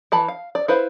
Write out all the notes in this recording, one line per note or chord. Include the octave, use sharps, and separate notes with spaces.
E3 A5 B5
F5
D5
E4 B4 C5 F5